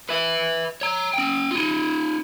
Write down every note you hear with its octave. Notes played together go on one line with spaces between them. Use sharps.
B4 E5
C#5 A#5
C#4 G5
D#4 F4